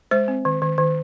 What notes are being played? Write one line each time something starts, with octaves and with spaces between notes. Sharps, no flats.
G#3 C5
C4
D#3
D#3
D#3